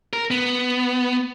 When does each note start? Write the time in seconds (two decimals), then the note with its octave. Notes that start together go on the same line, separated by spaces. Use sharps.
0.13 A#4
0.31 B3